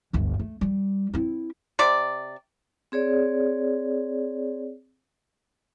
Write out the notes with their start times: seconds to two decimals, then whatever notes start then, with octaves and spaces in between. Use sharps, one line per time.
0.13 G1 D2
0.39 A3
0.61 G3
1.14 C4 E4
1.79 C3 D5
2.92 C4 G#4 C#5 D5